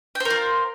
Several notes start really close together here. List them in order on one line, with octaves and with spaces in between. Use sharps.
G5 C5 A#4 F4